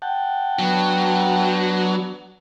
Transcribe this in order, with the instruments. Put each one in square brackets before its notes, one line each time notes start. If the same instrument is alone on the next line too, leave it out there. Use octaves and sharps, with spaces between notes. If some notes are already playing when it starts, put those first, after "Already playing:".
[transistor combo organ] F#5 G5 A5
[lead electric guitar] F#3 [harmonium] B3 D4